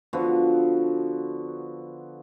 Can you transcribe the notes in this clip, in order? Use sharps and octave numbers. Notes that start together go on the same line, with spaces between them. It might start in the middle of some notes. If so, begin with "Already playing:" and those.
D3 F3 B3 F#4